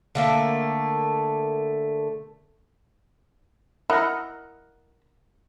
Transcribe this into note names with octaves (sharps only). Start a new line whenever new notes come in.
D3 A3 A#3
E4 A#4 D#5 F#5